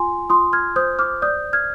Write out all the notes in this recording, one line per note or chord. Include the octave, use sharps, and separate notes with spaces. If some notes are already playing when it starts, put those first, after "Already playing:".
Already playing: F4 G#5 C6
F4 C6 D#6
F6 G#6
C5 D#6 G6
D6 F6
D5 D#6 G6
F6 G#6